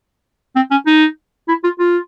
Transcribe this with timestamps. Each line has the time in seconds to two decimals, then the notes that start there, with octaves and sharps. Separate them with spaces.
0.56 C4
0.71 C#4
0.87 D#4
1.48 E4
1.64 F4
1.79 F4